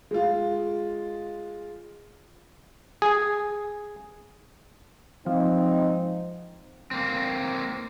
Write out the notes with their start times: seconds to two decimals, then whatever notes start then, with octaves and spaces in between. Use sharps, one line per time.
0.11 G#3 F4
3.02 G#4
5.26 G#2 F3 C4 D#4
6.91 A#3 C4